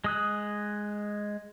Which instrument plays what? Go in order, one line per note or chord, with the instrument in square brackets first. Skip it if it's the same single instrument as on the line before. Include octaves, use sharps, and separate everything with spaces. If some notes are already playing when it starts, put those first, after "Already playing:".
[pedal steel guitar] G#3 D#6 F#6